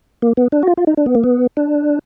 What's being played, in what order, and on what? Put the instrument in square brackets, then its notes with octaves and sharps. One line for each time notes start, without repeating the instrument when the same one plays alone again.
[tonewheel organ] A#3
B3
D4
F#4
F4
F4
D#4
D4
B3
A#3
B3
D4